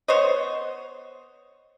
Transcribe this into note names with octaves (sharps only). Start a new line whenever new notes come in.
B3 C5 C#5 D#5